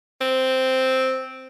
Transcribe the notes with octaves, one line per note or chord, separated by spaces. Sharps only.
C4